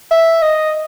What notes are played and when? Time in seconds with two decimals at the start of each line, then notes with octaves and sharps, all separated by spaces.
0.11 E5
0.42 D#5